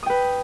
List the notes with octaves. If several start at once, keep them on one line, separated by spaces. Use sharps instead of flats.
B4 G5 D#6